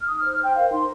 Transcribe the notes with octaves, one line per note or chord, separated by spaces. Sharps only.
F6
D#4 D#6
C5 F6
F6
C5 G5
A#4 F5
D#4 C6